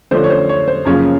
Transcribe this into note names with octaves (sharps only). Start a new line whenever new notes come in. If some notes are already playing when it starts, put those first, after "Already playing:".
D3 F3 A3 C#4 C5
C#5
C5
C#5
C5
F#2 C#3 F3 A#3 C#4 C#5